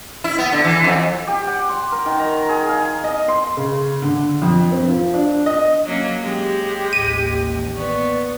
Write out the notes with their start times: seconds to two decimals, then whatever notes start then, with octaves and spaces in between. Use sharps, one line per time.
0.24 E4
0.38 B3
0.52 D3
0.64 E3
0.84 F2
1.27 G4
1.47 F#5
1.69 C6
1.92 A#4
2.06 D#3
2.19 A#5
2.49 G#4
2.69 F5
3.04 D#5
3.28 C6
3.57 C#3
4.02 D3
4.42 F2
4.71 C4
4.87 F3
5.14 D4
5.46 D#5
5.85 F#3 A#3 C#4
6.22 G#3 G4
6.93 A1 D#2 D#7
7.77 B3 D5 C#6